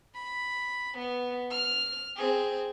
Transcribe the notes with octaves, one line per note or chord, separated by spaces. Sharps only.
B5
B3
F6 F7
C4 G#4